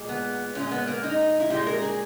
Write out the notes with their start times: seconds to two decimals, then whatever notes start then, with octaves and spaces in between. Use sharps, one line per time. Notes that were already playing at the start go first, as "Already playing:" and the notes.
Already playing: A#2 G#3
0.09 B3
0.55 A#2 G#3 C#4
0.71 B3
0.87 A#3
1.04 D#4
1.40 E4
1.50 A#2 G#3 G4
1.67 A#4
1.82 G#4